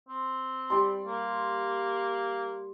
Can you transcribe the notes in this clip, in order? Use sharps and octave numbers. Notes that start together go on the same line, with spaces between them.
C4
G3 D5 C6
A#3